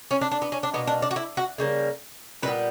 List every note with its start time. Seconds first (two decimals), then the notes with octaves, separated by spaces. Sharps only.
0.11 C#4
0.21 D4
0.31 D4
0.42 B3
0.52 C#4
0.63 D4
0.74 B2 A#3 B3
0.87 D4
1.02 D4
1.11 F#4
1.16 E4
1.37 F#4
1.58 C#3 G3 A#3
2.42 A#2 G3 B3 B4